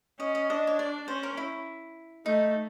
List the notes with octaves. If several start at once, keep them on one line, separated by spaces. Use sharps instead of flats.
C#4 D#5
D#5
D4 D#5
C#5
D5
C#4 C5
A#4
E4
A3 D#4